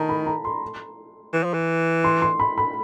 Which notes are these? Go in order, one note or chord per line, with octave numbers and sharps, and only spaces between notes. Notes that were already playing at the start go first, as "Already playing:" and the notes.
Already playing: D#3 A5 A#5
B5
A#5
C6
E3
F3
E3
C6
C6
B5
B5